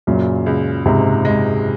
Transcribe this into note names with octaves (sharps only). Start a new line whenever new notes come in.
F#2 A#2 C#3
C#2
C#2 G#2 C3
G#3